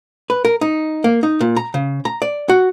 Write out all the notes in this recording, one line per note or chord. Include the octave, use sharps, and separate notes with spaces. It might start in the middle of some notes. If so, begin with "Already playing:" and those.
B4
A#4
D#4
A#3
D#4
A#2
A#5
C#3
A#5
D5
F#4